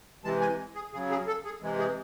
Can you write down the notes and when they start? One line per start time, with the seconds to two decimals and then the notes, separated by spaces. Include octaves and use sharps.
0.24 C3 E3 G#3 A5
0.41 G#5
0.75 G#4
0.93 C#3 F#3 G#4
1.10 G#4
1.27 A4
1.45 G#4
1.62 C3 E3 G#3
1.79 G#4